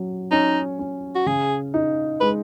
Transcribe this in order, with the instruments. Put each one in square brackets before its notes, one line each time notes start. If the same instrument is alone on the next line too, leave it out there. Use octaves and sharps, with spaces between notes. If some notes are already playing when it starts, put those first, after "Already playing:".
Already playing: [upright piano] F#3 C#4
[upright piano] C#4 [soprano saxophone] D#4
[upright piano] C#4
[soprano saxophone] F#4
[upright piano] C#3 [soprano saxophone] G#4
[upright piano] D#4
[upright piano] G#3 [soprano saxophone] B4